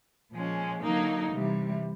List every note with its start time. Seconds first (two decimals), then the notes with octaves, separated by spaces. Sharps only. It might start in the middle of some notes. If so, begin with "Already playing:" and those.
0.32 A#2 F3 G#3 C#4
0.82 D3 F#3 A#3 D#4
1.33 C3 E3 G3